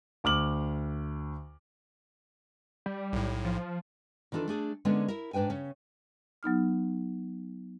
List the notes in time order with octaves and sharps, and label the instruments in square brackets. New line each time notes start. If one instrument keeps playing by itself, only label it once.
[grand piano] D2 D6 F6 F#7
[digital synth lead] G3
[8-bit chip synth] B1 A2
[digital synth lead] F3
[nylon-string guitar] D#3 E3 D4 F4 A4
A3 D4 G#4
D3 G#3 A#3 B3 C#4 D4
E4 A#4
G#2 D4 B4 G5 G#5
C#3 C#4
[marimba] F#3 B3 D#4 F6